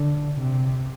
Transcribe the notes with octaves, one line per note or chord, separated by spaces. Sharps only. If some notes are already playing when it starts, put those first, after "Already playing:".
Already playing: D3
C3